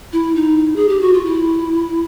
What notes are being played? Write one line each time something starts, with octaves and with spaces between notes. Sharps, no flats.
E4
D#4
G#4
G4
F#4
F4
E4